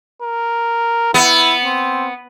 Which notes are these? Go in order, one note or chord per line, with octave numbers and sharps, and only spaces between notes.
A#4
B3 E4
C4